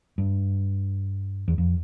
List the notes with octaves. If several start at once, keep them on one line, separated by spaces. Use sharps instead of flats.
G2
E2
F2